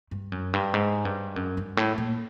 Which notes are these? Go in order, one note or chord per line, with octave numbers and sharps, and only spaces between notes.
G2
F#2
G2
G#2
G2
F#2
G2
A2
A#2